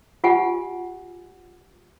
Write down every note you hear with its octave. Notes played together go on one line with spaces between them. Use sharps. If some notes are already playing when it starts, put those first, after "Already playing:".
F4 G4 F#5 G#5